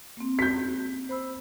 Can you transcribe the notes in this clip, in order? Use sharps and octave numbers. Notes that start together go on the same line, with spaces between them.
A#3 C4
G6 B6
C5 B5 E6